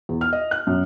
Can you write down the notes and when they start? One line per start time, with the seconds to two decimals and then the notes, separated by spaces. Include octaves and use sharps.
0.09 E2
0.21 F6
0.33 D#5
0.51 F#6
0.67 F#2